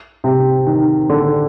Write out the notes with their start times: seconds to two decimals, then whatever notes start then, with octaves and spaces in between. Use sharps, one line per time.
0.24 C3
0.67 D#3
1.10 D3